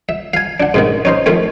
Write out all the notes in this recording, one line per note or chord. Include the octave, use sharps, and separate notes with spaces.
E5
F5 G#5
D4 F#5
G#2 C3 D#3
C#4 D#4 C5
D#3 F3 A3 C4